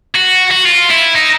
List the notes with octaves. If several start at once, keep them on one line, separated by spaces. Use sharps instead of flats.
F#4
F#4
F4
E4
D#4